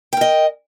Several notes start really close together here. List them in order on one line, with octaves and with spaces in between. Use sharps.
G5 A#4 D#5